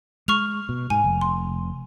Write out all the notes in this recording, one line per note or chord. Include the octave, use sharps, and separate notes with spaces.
G#3 C#6 F6 F7
B2
G#2 G#5
F1
C6